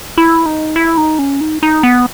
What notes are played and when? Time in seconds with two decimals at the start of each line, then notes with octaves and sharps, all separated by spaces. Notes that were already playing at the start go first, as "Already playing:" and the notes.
0.18 E4
0.46 D#4
0.76 E4
0.97 D#4
1.19 C#4
1.41 D#4
1.63 D#4
1.83 B3